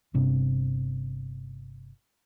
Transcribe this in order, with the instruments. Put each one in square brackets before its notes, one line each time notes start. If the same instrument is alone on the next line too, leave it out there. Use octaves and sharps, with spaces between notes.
[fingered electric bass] G1 C3 D4